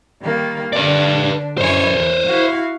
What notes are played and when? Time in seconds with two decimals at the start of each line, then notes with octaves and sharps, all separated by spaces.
0.22 D#3 G3 A#3
0.73 D3 D4 B4 D5
1.58 F#2 E4 C5 C#5 G#5
1.94 E2
2.26 E4 F#4 F5